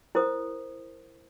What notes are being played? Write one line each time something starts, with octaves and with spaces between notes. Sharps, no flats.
E4 A#4 C5 D#6